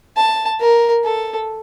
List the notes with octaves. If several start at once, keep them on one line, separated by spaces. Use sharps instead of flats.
A5
A#4
A4